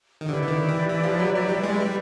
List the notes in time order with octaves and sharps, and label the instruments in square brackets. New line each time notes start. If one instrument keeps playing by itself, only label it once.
[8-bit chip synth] D#3
[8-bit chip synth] D3 [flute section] E4 G4 B4 D5
[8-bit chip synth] D3
D#3
E3
E3
F3
F#3
F#3
G3
G#3
G3